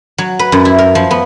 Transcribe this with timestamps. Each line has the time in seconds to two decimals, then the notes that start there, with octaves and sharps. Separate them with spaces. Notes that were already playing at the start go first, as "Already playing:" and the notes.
0.18 F#3
0.39 B4
0.52 F#2
0.65 E4
0.79 A#4
0.95 F3
1.11 B3